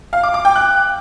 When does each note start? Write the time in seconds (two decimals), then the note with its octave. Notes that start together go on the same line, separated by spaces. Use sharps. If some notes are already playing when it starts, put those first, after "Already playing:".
0.13 F5
0.23 D6
0.34 D6
0.45 G5
0.56 F#6